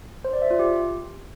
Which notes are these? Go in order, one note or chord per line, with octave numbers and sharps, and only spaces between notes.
C5
D5
E5
F4
G4